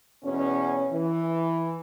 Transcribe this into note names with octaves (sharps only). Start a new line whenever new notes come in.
E2 B2 C#4
E3